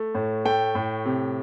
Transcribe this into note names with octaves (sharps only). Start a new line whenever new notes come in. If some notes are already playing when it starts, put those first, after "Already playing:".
Already playing: A3
A2
A3 G5
A2
C3